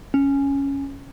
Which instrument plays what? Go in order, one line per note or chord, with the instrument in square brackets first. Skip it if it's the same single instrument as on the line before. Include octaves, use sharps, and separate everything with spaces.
[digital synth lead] C#4